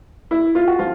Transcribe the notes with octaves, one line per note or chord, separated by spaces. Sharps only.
E4
F4
F#4
F3 F4